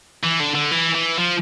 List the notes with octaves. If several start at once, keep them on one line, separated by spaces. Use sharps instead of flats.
E3
D3
D3
E3
E3
F3